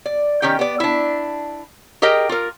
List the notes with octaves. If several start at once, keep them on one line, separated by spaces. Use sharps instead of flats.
D5
D#3 C#4 G4 G5
B3 D5
D4 E4
G4 G#4 A#4 D#5 G5
F4 A#4